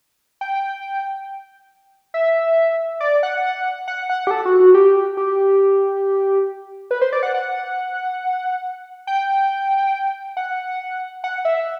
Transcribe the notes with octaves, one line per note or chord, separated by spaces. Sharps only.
G5
E5
D5
F#5
F#5
F#5
G4
A4
F#4
F#4
G4
G4
B4
C5
D5
F#5
F#5
G5
F#5
F#5
E5